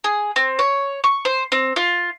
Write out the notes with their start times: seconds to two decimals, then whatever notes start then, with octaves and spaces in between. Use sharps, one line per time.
0.04 G#4
0.36 C4
0.59 C#5
1.04 C#6
1.25 C5
1.52 C4
1.76 F4